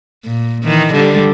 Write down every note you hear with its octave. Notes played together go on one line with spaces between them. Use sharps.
A#2
D#3 E3
D3 G3